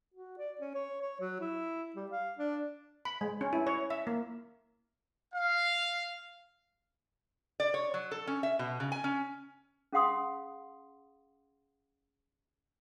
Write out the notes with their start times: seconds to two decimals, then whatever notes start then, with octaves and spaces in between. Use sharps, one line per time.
0.14 F#4
0.38 D5
0.61 C#4
0.75 C#5
1.02 C#5
1.21 F#3
1.41 E4
1.96 G3
2.12 F5
2.39 D4
3.05 B5
3.21 G#3
3.41 C#4
3.53 E4
3.67 C#5
3.90 E5
4.07 A#3
5.35 F5
7.60 D5
7.74 C#5
7.94 F#3
8.11 A4
8.27 C#4
8.43 E5
8.59 B2
8.80 C#3
8.92 G#5
9.04 C#4
9.93 C#4 G#4 F5 F#5 C6 D#6